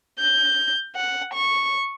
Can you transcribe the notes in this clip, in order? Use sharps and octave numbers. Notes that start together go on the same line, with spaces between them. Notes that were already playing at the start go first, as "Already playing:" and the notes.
G6
F#5
C#6